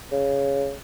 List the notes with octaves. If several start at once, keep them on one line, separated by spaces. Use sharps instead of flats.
C#3